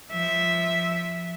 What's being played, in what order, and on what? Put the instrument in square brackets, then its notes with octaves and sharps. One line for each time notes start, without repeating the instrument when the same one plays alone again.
[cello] F3 E5